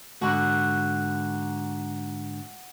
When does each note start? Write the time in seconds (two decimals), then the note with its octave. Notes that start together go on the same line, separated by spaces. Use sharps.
0.21 G#2 D3 F#4